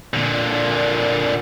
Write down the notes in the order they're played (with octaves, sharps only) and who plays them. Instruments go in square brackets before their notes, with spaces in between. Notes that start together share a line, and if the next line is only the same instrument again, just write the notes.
[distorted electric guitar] A#2 D3